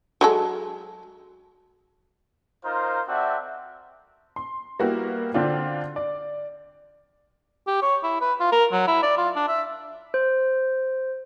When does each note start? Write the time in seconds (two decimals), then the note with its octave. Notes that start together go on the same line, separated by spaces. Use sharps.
0.21 F#3 G#3 A4
2.65 D#4 F4 A#4 C5
3.08 C4 F#4 A4 D5 E5 F#5
4.36 C6
4.79 G3 A#3 B3 E4 F#4
5.34 D3 C4 D4 F4
5.96 D5
7.67 G4
7.82 C#5
8.03 E4
8.21 B4
8.40 F4
8.52 A#4
8.72 F#3
8.87 E4
9.03 D5
9.17 F4
9.36 D4
9.48 E5
10.14 C5